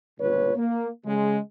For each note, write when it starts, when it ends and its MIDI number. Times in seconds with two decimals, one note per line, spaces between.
0.20 0.52 31
0.20 0.52 37
0.20 0.52 46
0.20 0.52 71
0.20 0.52 73
0.56 0.88 58
1.05 1.39 49
1.05 1.39 56